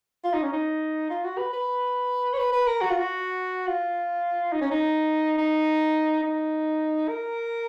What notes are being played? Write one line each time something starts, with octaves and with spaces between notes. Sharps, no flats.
F4
D#4
C#4
D#4
F4
F#4
B4
B4
C#5
B4
B4
A#4
F#4
F4
F#4
F4
D#4
C#4
D#4
D#4
D#4
A#4